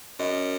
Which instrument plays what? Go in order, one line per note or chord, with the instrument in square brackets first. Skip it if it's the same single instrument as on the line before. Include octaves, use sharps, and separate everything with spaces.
[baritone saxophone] F#2 [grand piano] D#5